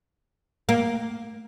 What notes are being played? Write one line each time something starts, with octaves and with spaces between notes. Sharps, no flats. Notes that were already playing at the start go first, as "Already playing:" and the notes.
A#3